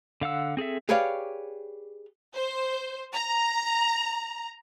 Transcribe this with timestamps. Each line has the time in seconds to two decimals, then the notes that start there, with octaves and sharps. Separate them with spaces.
0.21 D3 F5 F#5 E6
0.57 C4 G#4 A4 E5
0.89 G4 G#4 B4 C#5 D5 F5
2.35 C5
3.13 A#5